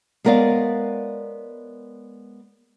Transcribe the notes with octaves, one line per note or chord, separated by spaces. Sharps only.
G#3 B3 A#4 C#5 D5 F5